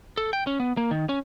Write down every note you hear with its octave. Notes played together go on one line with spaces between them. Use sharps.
A4
G5
C#4
B3
A#3
D#3
C#4